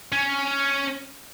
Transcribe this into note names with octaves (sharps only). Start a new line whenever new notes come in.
C#4